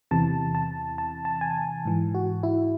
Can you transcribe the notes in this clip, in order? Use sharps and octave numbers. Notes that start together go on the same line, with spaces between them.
E2 C3 E3 A5
A5
A5
A5
G#5
G#2 E3
F#4
E4